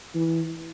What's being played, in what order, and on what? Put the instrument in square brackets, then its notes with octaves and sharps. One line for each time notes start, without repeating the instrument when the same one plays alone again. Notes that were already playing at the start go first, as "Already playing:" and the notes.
[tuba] E3